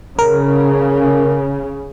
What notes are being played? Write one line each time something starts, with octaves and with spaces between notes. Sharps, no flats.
C#3 A#4